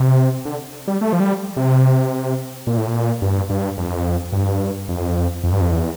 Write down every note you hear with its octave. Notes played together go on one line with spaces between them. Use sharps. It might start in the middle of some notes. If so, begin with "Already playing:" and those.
Already playing: C3
D3
G3
A3
F3
G3
C3
A#2
A2
A#2
G2
G2
F2
G2
F2
F2
G2
F2
E2